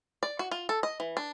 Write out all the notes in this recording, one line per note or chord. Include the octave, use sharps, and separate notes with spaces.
D5
F#4
F4
A4
D#5
E3
D4